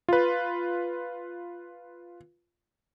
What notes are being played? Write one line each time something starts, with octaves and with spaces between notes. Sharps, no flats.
F4 B4